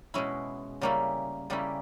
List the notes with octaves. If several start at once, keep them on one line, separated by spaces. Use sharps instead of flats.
B2 G#3 C#4 E4
C#3 G3 A#3 C#4 E4
C#3 G3 A#3 C#4 E4